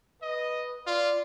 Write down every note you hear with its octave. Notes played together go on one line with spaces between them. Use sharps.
B4 D#5
F4 D5